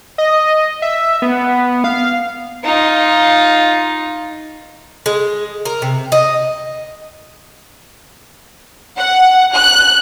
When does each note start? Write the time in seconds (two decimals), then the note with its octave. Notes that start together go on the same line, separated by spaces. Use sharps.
0.18 D#5
0.82 E5
1.22 B3
1.84 F5
2.64 D#4 F4
5.06 G#3
5.65 A#4
5.82 C3
6.12 D#5
8.98 F#5
9.54 F#6